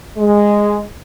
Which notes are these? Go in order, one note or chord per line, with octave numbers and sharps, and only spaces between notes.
G#3